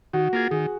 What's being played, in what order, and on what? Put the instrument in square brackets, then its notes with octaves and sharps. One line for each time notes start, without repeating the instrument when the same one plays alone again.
[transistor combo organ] D#3 [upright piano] F#4
[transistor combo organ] A#3 F4 G#4
[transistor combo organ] D#3 [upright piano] G#4